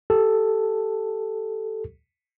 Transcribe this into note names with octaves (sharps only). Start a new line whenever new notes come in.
G4 A4